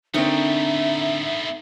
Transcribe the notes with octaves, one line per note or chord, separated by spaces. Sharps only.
D3 A3 B3 C4 D#4 A#4 C#5 E5